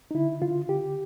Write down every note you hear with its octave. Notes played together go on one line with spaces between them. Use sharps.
D#4
D3 E4
D3 F4
D3 G4